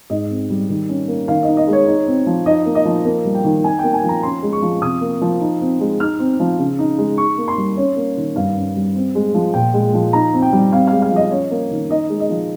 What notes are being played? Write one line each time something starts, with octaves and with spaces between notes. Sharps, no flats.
G#2 D#5
C4
G3
D#3
C#4
A#3
D#3 F5
D#4 D#5
D#5
G#3
C#5
D#4
C4
F3
D#4 D#5
A#3
D#5
F3
A#3
G3
G5
D#3
D#4 G#5
A#3 G5
G#5
F3
A#5
C#4 C6
G#3
C#6
F3
C3 D#6
A#3
F3
D#4
C4
G#3
D#4 F6
C4
F3
C#3
D#4
G#3
D#4 C#6
A#3
C6
G3
C#4 C#5
A#3
D#3
G2 F5
C#4
G3
C4
G#3
F3
A#2 G5
G#3
F3
D#4 A#5
C4
G5
G3
C4 F5
G#3 F5
F5
F3 D#5
C#4 C#5
A#3
D#3
D#4 D#5
G#3
D#5
F3